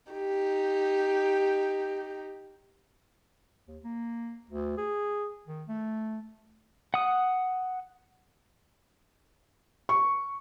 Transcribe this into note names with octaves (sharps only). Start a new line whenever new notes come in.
D#4 G4
D#2
A#3
D2
G#4
D#3
A3
F#5 D#6
C#6